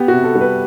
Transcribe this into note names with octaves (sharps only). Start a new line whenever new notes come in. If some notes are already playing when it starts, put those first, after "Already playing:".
Already playing: B3 G4
C3 F#4
A4
G3
B4